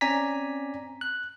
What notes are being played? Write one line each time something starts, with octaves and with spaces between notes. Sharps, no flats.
C4 C#4 D5 G#5 A#5 B6
F#6